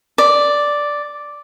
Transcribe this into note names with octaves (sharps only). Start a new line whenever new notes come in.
D5